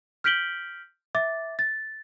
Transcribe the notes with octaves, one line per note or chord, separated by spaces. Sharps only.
F6 G6 B6 D7 F#7 G7
E5 D6 A6
A6